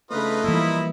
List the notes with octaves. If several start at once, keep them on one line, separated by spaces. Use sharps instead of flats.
C#3 A3 D4 D#4 F4 B4 D#5
E3 F3 G3 A#3 E4